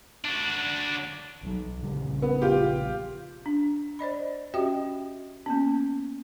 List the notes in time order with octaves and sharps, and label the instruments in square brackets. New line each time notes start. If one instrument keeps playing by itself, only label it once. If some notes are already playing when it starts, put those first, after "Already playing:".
[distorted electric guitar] D4 F#4
[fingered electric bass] B1 F#3
A#1 C#3 G3
[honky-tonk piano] B3
F4 G4
[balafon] D4
C5 D5 D#5 B5
C#4 F#4 G4 D#5 E5 G5
A#3 B3 C#4